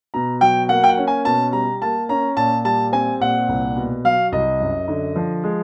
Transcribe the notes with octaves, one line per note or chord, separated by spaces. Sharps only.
B2 A#5
F#3 G5
A#3 F#5
G5
F#5
C#4
G#5
B2 A5
G3 A#5
A#3 A5
C#4 A#5
A#2 A5
G3 A5
C4 G#5
A#2 F#5
C2
B2
F#3 F5
C2 D#5
F#2
D3
F3
G#3